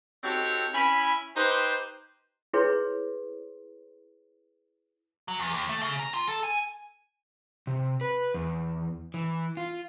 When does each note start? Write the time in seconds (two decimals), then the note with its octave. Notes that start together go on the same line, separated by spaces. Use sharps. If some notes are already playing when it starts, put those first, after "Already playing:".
0.23 C4 D#4 F#4 G4 A4 C#5
0.74 C#4 E4 G#5 B5
1.36 D#4 G4 B4 C5
2.53 E4 G#4 B4 C#5 C6
5.28 F#3
5.40 E2
5.54 D#2
5.69 A3
5.82 C#3
5.99 A#5
6.14 F4
6.29 A4
6.43 G#5
7.67 C3
8.01 B4
8.34 E2
9.14 E3
9.57 F4